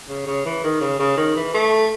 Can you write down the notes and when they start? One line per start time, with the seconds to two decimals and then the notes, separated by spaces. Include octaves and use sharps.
0.09 C#3
0.26 C#3
0.45 E3
0.64 D#3
0.81 C#3
0.99 C#3
1.17 D#3
1.36 E3
1.54 A3